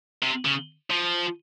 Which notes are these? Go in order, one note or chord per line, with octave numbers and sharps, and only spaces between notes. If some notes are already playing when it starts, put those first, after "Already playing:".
C3
C#3
F3